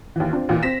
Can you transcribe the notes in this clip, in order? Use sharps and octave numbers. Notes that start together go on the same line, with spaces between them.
D#2 E3
C4 D4 F4
D#2 A#2 E3
C4 A#6 B6 E7